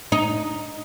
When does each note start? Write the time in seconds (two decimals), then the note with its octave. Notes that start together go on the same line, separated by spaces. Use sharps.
0.12 D#4